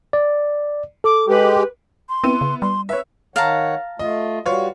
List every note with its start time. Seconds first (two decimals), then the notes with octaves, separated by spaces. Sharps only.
0.13 D5
1.04 A4 D6
1.28 G#3 G4 B4
2.09 C6
2.24 B3 C4 E4 D#7
2.41 C#3
2.62 G3 C6
2.89 B4 C#5 E5
3.36 D#3 C#5 F5 F#5 A5 A#5
3.99 A3 F4 D#5
4.46 G3 F4 F#4 B4 C#5